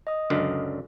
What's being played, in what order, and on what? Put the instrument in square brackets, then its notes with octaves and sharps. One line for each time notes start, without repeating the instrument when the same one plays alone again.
[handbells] D#5 D#6
[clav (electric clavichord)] C#2 F#2 D3